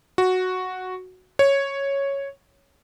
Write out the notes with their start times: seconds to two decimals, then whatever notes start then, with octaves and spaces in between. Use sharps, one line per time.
0.18 F#4
1.39 C#5